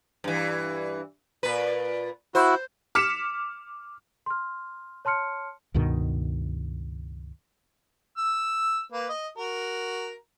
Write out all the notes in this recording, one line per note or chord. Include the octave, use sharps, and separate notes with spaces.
G2 E3
A#2 B4
E4 F#4 C5
D6 F6 B6 C#7 E7
C6 F6
C#5 A5 C6 F6 C#7
C#2 G2 B2 D#3
E6
A#3 B4
D#5
F#4 A#4